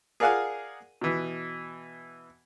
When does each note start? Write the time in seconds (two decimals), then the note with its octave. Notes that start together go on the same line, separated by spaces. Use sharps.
0.20 G#4 A#4 D5 F5 F#5 G#5
1.01 B2 E3